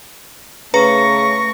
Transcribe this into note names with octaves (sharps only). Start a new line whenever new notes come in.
C#3 A3 B4 A#5 C#6 A#6 C#7